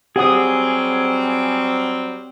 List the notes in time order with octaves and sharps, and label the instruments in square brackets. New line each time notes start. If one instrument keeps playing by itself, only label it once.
[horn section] F#3 G3 C4 [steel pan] G4 F#5 D#6 [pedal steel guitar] G#4